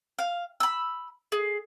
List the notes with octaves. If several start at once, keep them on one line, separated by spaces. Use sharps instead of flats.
F5
B5 E6
G#4